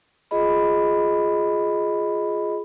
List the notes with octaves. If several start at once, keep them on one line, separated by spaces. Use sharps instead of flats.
F4 G#4 D#5 B5